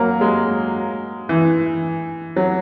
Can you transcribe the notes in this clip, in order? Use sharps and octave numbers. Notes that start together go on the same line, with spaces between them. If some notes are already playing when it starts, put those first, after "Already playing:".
Already playing: F#3 A#3
G#3
E3
F#3